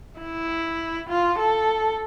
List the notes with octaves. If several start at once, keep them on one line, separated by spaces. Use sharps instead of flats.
E4
F4
A4